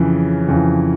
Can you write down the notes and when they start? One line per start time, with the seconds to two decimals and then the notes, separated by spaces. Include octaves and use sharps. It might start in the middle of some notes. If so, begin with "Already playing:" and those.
Already playing: F2 C#3 E3
0.48 F2 C#3 E3